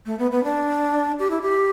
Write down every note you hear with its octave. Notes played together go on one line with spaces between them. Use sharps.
A3
B3
B3
D4
G4
E4
G4